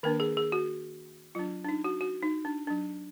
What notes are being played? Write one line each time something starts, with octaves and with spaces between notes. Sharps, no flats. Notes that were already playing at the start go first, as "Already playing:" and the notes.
D#3 A#3 D4 A#4
G#4
G#4
F#4
F#3 D4 F4
D4
D#4
F#4
F#4
D#4
D4
F#3 D4